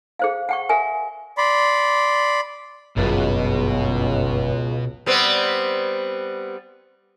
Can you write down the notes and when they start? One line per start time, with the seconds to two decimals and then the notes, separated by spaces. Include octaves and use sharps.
0.19 G#4 C5 F5
0.49 F#5 G5 C#6
0.69 A#4 E5 G#5
1.38 D5 B5 C6
2.97 G1 C#2 F#2 B2 B4
5.06 G3 B3 C4